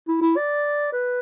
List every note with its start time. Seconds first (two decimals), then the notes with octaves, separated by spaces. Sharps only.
0.08 E4
0.21 E4
0.37 D5
0.92 B4